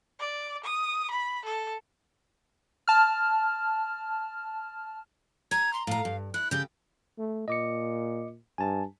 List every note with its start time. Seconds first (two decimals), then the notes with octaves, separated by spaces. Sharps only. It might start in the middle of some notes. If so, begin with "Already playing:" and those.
0.19 D5
0.64 D#6
1.11 B5
1.45 A4
2.88 A5 F6
5.51 A#5 G#6
5.73 C6
5.87 A2 F5 A#5
6.05 G2
6.34 E4 F#6
6.51 C#3 G4 G6
7.18 A3
7.48 A#2 D#5 D6 C#7
8.58 G2 G#5 A5